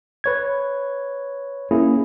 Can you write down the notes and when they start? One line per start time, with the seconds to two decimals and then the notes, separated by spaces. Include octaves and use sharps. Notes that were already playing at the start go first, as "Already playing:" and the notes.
0.24 B4 C#5 G#6
1.71 A#3 C#4 E4 G#4